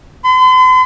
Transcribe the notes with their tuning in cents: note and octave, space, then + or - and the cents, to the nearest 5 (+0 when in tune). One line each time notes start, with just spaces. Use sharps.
C6 -45